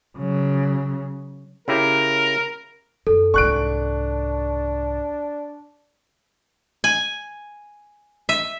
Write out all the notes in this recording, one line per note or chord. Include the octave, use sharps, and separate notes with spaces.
C#3 F#3
C#3 E4 G4 A#4
F#2 A4
C2 G#2 D4 C#6 F#6 D7
G#5
E5